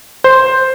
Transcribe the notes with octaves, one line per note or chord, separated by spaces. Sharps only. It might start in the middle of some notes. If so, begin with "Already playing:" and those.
C5